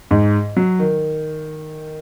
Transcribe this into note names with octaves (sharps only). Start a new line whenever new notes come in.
G#2
F#3
D#3